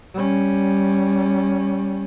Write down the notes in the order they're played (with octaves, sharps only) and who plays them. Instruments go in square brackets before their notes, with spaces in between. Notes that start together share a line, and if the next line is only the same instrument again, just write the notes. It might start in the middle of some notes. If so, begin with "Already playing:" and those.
[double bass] G3 C#4